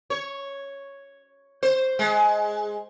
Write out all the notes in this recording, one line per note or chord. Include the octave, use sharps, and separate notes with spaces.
C#5
C5
G#3